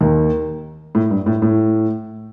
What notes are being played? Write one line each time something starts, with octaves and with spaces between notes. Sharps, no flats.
D#2 D#3
A2
G2
A2
A2